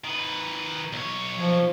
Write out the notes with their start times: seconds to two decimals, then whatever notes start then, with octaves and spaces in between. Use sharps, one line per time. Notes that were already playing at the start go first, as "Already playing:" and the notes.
0.04 D#3 B4
0.93 B1 C#5
1.35 F3